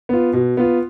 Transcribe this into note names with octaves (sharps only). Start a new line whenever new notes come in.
B3 F4
B2
B3 F4